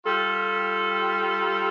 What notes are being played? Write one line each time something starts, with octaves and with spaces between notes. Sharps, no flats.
G3 F4 A4